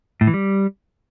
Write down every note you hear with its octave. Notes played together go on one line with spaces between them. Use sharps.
A2
E3
G3